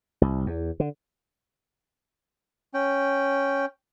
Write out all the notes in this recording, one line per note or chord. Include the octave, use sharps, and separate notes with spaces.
C2
E2
D3
C#4 G5